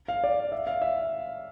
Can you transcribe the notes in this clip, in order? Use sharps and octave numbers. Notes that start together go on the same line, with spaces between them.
F5
D5
E5
F5
E5